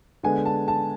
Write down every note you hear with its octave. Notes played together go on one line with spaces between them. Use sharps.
D3 G#3 B3 G#5
A5
A5